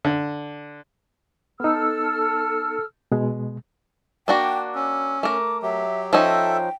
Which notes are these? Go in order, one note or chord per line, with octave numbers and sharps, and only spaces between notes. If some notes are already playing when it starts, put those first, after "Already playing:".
D3
B3 D#4 A4 E6 F6
B2 G#3
A#3 D4 F#4 G5
C#4 E6
A3 A#4 D6
F#3 G4 E5
F3 C#4 D#4 A4 E5 G5